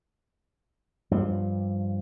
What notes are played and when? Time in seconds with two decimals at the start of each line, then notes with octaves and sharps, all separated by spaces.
1.11 G2 F3